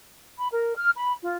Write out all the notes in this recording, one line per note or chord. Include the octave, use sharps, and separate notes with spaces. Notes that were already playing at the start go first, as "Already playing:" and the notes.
B5
A#4
F6
B5
F4